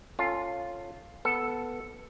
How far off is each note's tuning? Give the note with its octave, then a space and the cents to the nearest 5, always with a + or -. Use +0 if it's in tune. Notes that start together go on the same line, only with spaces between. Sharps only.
C#4 -10 F4 +0 A4 +15
B3 -5 A4 +0